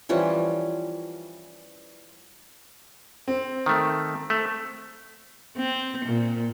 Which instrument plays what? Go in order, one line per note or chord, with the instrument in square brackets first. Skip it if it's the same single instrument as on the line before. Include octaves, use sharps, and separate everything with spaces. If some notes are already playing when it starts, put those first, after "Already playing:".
[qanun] E3 F3 G3 C#4
[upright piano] C4
[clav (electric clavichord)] D#3 A3
A3
[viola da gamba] C4
A#2